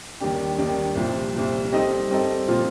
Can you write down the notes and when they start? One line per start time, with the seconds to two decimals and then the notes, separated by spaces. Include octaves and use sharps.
0.20 D#2 D#3 G3 D4 G4
0.58 D#2 D#3 G3 D4 G4
0.96 C2 A#2 F3
1.34 C2 A#2 F3
1.72 G3 C4 D#4 A4 D#5
2.10 G3 C4 D#4 A4 D#5
2.48 A#2 F3 C4 F4